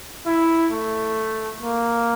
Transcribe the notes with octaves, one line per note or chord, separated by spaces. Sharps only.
E4
A3
A#3